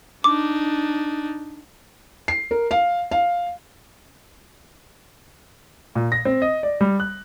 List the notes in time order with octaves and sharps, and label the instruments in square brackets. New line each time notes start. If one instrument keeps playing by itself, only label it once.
[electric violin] D4 D#4 [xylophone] D6
[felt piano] C7
A#4
F5
F5
[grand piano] A#2
A#6
C4
D#5
D5
G3
F#6